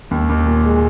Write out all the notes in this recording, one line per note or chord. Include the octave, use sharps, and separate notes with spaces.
D#2
D#2
A#2
G#3